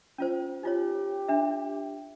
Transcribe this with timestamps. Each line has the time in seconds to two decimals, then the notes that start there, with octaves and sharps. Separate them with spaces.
0.18 C#4 F4 C5
0.63 D#4 F4 G4 C#5
1.28 D4 E5